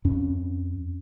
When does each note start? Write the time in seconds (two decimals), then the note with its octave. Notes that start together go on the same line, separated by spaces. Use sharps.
0.05 F2 C#4